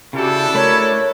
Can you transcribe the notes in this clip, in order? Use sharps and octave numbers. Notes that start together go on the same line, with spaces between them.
C#3 D4 E4 F#4 G4 A4
A3 A#4 C#5 B5